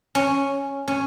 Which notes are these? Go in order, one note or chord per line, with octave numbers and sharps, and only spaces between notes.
C#4
C#4